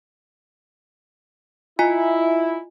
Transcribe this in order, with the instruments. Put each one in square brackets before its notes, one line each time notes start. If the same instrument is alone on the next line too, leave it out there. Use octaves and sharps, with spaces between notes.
[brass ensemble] E4 [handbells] F4 D#5 G#5